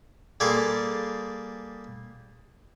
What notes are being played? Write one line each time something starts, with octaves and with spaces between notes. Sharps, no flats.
G3 A#3 G#4 A4 C6